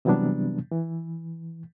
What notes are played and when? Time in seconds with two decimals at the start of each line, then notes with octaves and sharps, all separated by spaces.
0.05 C3 E3 F#3 G3 B3 D4
0.71 E3